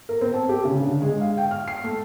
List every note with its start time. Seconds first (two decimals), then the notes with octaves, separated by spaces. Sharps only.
0.09 A#4
0.21 C4
0.34 A5
0.49 G4
0.65 C#3
0.80 D3
1.02 G#3
1.21 F5
1.38 G5
1.51 F6
1.68 C7
1.84 A3